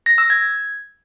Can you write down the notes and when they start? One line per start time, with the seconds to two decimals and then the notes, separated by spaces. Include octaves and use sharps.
0.06 A#6
0.18 E6
0.30 G#6